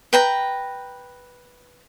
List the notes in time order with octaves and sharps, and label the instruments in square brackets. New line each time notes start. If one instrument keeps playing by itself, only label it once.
[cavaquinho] B4 G5 A#5